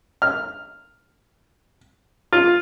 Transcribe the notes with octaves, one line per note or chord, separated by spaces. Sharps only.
F6
F4